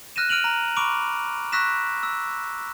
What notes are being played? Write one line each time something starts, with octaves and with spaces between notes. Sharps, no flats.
F6 F#6 A#6 D#7 E7
F6 D7 D#7 F7 F#7
A#5
B5 C#6 D6 D7 F7
C#6 E6 F#6 A#6 B6 E7
E6